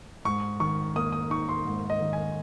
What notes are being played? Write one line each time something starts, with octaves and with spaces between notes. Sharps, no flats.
G#2 C#6
D#3 C#6
A#3 D#6
D#6
D#4 C#6
C6
G#2
D#5
D#3
G#5